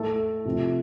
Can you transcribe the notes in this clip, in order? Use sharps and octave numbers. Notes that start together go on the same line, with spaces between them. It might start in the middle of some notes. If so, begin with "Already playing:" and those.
Already playing: A2 A3 A4
C3 F3 A3